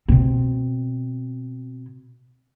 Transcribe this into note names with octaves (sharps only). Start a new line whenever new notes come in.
B2 C4